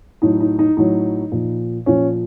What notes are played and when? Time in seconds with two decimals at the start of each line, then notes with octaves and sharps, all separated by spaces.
0.22 A2 F#3 D#4
0.40 D#4
0.59 D#4
0.77 A2 F#3 D#4
1.32 A#2 F3
1.86 A#2 F3 C#4